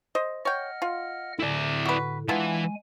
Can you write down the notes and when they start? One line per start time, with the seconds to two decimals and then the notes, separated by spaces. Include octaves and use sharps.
0.15 C5 D#5
0.45 C#5 D#5 F#5 G5 F6
0.82 F4
1.39 A2 D3 E4 D5
1.85 F#4 B4
2.29 E3 G#3 B3 D4 F4 G#5